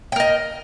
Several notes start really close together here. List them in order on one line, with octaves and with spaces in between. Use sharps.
G5 A#4 D#5